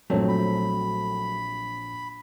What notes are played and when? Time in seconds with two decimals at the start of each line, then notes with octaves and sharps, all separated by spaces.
0.10 A#1 F#3 A3 C4 C#5 A5
0.29 B5